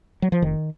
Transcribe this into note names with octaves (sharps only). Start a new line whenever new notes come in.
F#3
F3
F1 D#3